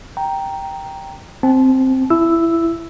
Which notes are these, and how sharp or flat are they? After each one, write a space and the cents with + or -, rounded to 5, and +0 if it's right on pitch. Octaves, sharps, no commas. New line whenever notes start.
G5 +0 A#5 +0
C4 +0 A5 -35
E4 +15 E6 +0